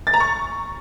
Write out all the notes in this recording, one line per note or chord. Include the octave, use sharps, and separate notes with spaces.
A6
A#5
C#6